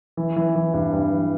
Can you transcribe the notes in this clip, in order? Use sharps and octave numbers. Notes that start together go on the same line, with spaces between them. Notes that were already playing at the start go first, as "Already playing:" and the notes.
E3
E3
E3
G2
G2
E3